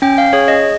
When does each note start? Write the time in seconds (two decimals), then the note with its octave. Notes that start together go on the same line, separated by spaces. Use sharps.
0.02 C#4 G5
0.18 F5
0.33 G#4 C#5
0.48 D#5